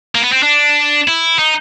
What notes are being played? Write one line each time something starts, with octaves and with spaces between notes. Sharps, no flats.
A#3
B3
C4
D4
E4
D#4